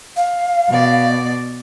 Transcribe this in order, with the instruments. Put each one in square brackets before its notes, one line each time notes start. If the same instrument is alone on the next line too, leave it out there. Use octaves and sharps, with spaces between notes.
[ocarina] F5
[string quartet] B2 D5